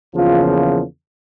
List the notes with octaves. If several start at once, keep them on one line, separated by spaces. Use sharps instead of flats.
E2 C#3 F3 A#3 F4